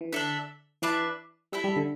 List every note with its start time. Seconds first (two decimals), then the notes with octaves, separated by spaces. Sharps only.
0.01 E3
0.13 D3 D4 A4 E5
0.82 E3 D4 B4 E5 A5
1.52 G3 E4 A4 E5
1.64 G3
1.76 D3